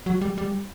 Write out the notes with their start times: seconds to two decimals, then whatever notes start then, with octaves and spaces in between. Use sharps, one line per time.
0.06 F#3
0.21 G3
0.38 G3